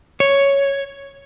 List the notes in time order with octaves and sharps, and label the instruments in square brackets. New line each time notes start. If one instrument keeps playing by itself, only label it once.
[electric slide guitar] C#5